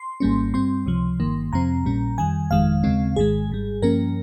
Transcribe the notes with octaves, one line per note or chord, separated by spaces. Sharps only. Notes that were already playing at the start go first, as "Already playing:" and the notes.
Already playing: C6
G#1 G#2 G3 A#3 C#4
G2 G3 C4 C6
C#2 C3 F3
G1 G2 D#3 A#3
F2 C3 F3 C4 A#5
A#1 A#2 G3 C#4
F2 D#3 G3 G#5
G1 F2 D#3 G#3 F5
D#2 C#3 G#3 C4
G#1 G#2 D#3 G#3 G#4
G#1 G#2 G3
G2 F3 A#3 C#4 A#4